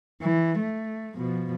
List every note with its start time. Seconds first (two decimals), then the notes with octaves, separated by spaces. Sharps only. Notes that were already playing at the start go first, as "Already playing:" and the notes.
0.22 E3
0.59 A3
1.17 B2 F3